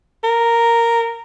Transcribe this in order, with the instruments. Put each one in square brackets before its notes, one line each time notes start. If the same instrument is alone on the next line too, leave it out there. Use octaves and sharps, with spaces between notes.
[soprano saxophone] A#4